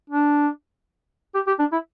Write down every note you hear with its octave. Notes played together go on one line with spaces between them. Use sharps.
D4
G4
G4
D4
E4